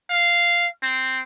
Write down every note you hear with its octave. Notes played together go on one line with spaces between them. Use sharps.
F5
C4